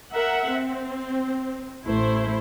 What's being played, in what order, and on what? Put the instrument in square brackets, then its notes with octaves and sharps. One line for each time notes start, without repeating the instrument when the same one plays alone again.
[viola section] A#4 E5 F#5
C4
[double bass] A1 A3 [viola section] E4 C5